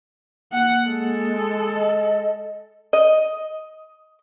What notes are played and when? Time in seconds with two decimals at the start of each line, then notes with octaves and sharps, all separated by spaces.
0.52 A#3 F#5
0.86 G#3 A4
1.75 D#5
2.93 D#5